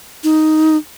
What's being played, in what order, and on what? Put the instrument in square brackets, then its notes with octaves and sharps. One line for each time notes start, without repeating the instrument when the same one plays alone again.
[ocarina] D#4